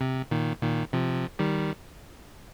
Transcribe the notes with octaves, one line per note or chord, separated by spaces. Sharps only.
C3
A#2 D#3
A#2 D#3
C3 F3
D#3 G3